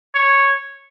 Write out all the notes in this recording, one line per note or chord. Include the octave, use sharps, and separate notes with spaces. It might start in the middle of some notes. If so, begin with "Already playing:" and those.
C#5